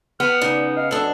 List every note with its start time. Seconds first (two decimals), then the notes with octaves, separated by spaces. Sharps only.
0.20 B3 F6
0.42 C#3 D#4 D5
0.76 D#5 F5
0.91 F#2 D4 A4